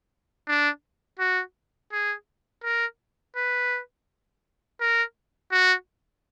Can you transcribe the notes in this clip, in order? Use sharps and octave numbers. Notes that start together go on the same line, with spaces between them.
D4
F#4
G#4
A#4
B4
A#4
F#4